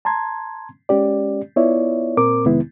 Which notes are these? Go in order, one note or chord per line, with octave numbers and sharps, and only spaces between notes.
A5 A#5 C6 G#6
G#3 C#4 G4 D5
B3 E4 F4 C#5 D5 E5
A#2 C4 A#4 D6
F2 C3 D#3 G#3 B3 E4